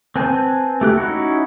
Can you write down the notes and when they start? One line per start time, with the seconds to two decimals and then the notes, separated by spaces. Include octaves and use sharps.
0.16 C4 B4 G#5 A5 G6
0.81 A3 G4 F#6
0.98 C#4 D#4 E4 F#4